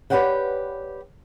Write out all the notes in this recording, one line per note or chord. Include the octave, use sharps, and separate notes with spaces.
G4 B4 C#5 D5 F#5 G5